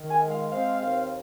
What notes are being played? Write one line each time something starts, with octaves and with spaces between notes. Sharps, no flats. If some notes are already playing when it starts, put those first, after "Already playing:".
Already playing: D#3
G#5
G#3
F5
C4 F5
D#2